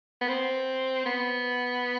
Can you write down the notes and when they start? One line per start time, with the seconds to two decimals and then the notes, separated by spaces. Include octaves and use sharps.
0.21 B3
0.29 C4
1.06 B3